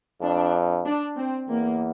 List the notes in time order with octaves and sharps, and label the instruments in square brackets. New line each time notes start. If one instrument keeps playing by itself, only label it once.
[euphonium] F2 [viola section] D4
[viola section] D4
C4
[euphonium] E2 [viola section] A#3